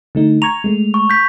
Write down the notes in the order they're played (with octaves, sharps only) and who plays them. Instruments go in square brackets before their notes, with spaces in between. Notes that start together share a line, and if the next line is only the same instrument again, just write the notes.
[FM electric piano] D3 A3 D#4
[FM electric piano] A#5 C#6 G#6 [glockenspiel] F7
[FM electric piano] G#3 A3
[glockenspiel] C#6
G6 B6